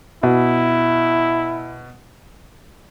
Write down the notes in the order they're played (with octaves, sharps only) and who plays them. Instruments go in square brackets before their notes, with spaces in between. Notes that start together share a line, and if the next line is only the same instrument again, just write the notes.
[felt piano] B2 [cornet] E4